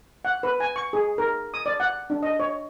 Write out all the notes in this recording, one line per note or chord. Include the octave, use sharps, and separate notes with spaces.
F#5
B4
G#5
C#6
G#4
A#4
D#6
D5
F#5
D4
D#5
C#5